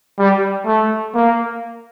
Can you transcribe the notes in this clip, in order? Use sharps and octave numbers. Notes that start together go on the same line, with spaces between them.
G3
A3
A#3